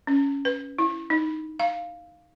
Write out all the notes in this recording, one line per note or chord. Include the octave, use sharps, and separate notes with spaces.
C#4
B4
E4
D#4
F5